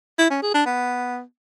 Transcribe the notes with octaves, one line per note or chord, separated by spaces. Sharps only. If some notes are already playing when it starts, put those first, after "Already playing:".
E4
C#4
G#4
D4
B3